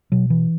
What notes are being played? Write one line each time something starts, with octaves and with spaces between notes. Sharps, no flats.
B2 F#3
E3